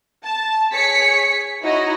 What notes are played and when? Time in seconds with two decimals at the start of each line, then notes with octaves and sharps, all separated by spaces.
0.24 A5
0.72 G#4 C#5 B6 C#7
1.62 D#4 E4 F#4 C#5 D#5 A#5